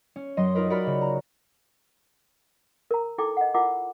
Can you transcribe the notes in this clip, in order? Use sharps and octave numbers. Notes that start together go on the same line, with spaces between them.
C#4
F#2 F#3 D#5 C6
D#4 F4 A#4 B4
F#4 A#4 D5 B5 F6
C#3
A#5
A#4 A#5
D#4 E4 A4 G5 D6
D#5 F#5
E4 F4 A#4 F#5 D6